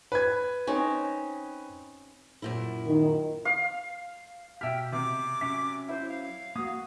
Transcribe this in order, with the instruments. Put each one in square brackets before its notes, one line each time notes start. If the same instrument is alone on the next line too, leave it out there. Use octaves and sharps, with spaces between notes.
[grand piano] B4 G#6
[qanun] C4 C#4 D#4
[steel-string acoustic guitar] F#2 A#2 E4
[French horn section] D#3
[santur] F5
[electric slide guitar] B2 G4 [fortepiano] E5 F6 [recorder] G5
[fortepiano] C3 [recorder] D6
[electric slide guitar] F#3 C#4 E5
[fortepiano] E4 [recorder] C5
[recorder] F5
[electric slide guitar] A#3 [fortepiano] F#4 D#6